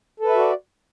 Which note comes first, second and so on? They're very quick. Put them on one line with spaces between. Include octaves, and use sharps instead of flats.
A4 B4 E5 F#4 D5